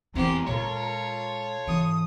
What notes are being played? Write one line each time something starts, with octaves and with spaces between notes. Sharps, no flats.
E2 E3 C4 G4 A#4 C5
A#2 G#3 F4 A4 C#5
G#2 E3 D#6